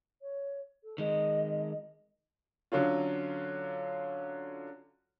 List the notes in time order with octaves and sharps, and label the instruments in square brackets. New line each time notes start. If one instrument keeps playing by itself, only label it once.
[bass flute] C#5
A4
[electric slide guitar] D#3 G#3 [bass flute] D#5
[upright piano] D3 F#3 C#4 F4